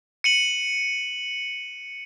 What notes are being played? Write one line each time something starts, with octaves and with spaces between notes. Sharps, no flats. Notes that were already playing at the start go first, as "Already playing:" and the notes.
C#7 D#7 F#7